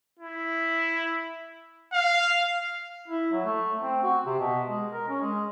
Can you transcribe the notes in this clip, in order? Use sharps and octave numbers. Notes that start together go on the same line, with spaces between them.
E4
F5
E4
F#3
A3
C4
F#4
C3
B2
G#3
A#4
C#4
G#3